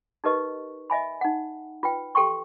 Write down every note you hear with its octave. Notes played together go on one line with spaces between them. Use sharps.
D#4 G4 A#4 B4 D#5 C#6
D#5 E5 G#5 B5
D#4 F#5
F4 B4 G5
G4 A4 G5 C6 C#6